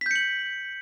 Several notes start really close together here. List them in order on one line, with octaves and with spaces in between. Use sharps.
B6 G6 C#7 F#7